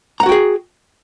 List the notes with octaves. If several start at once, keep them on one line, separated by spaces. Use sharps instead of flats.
F#4 G#4 F#5 G5 A#5